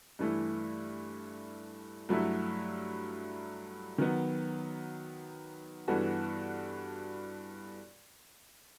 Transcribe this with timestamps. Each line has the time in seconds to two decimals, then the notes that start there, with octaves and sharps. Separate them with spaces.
0.19 G2 E3 A3 E4
2.09 G2 F#3 A3 E4
3.98 D#3 F#3 B3
5.88 G2 E3 B3 F#4 A4